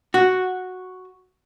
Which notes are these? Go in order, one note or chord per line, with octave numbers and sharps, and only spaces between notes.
F#4